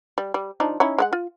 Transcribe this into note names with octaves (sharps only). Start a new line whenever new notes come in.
G3
G3
F3 D4 D#4
C#4 D#4 E4
G#3 F4 F#5
F4